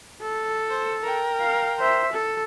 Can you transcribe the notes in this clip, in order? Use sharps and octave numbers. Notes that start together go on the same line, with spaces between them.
A4
C5
A#4 G5
F5
C5 E5
A4